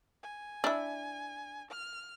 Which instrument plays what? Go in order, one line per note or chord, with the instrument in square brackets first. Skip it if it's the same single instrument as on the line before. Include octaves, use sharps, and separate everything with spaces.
[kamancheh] G#5
[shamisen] D4 E4
[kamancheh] F6